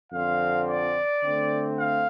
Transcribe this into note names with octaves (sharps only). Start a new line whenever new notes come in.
F2 D3 F3 C4 F5
D5
D3 A3 C4
F5